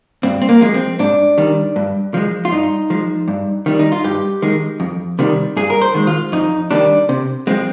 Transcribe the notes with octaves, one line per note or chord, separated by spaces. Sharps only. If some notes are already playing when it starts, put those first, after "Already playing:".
G2 C4
C4
A#3
F3 G#3
C4
G#2 D4
D#3 G3
G2
F3 G#3
F4
G2 D#4
F3 G#3
G2
D#3 G3
D#4
F4
G2 G4
D#3 G#3
F2
C3 D#3 G3
G2 G#4
A#4
C5
D#3 G#3
F4
F2 D#4
D#3 G3 D4
C3
F3 G#3 C4